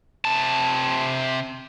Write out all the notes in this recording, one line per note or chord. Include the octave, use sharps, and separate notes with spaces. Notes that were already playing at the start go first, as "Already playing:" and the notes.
C3 A5